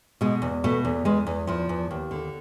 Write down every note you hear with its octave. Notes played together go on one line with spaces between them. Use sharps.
B2 G#3
E2
B2 A3
E2
E2 G#3
E2
E2 F3
E2
D#2
D3